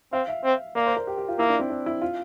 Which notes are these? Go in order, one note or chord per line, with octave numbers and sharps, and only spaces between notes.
C4 F5
E5
C4
A#3 D5
C5
A#4
G4
G4
F4
A#3 E4
D4
C4
D4
E4
F4